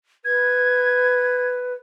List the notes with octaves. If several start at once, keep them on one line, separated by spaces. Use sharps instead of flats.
B4 G#6